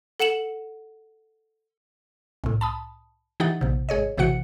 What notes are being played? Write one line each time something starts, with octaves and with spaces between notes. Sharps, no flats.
A4 F#5 C#7 E7 F#7
C2 A2
A5 B5 D#6
E3 D#4 G4 F#5 A6
A#1 C3
G#1 G#4 C#5 D#5
A1 C3 E3 F#4 F#5 C#7